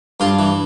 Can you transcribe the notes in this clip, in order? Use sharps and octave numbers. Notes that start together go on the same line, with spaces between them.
G2 F4
E3